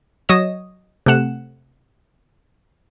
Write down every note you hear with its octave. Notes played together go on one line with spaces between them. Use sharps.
F#3 C#5 D#5 A#6 E7
C3 A3 F#5 E7